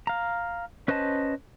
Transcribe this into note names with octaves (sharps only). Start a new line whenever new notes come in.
F5 A#5
C#4 B4 C5 D#5 A5